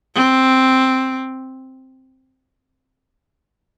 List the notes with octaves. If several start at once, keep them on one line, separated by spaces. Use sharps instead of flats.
C4